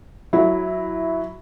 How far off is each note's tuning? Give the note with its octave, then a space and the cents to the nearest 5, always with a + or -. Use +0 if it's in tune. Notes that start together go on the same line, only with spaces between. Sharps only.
F#3 +0 E4 +0